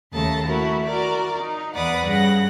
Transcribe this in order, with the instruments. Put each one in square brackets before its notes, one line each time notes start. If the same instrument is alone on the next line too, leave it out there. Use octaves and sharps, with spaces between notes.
[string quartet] D#2 C#3 A3 A4 A5 A#6
A3 E4 F#4 A#4
F#4 A#4 D5
D#4
E2 B4 D5 F#5 D#6
G2 C#3 F#5 A#6